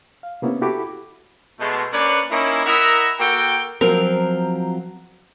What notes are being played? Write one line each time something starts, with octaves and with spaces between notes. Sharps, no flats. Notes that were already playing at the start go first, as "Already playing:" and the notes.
F5
C3 A#3 B3 C#4 E4
E4 F#4 G4 A4 B5 D6
B2 G#3 A3
A#3 C#4 D4 B4 C#5 D5
A#3 C#4 D#4 E4
E4 A#4 D#5 E5 F#5 A#5
A#3 F#4 A4 G5
F3 F#3 C4 A#4